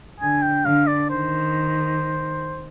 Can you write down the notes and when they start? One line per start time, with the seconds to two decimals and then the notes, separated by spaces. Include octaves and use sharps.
0.20 D3 G#5
0.42 G5
0.64 D3 F5
0.87 D5
1.09 D#3 C5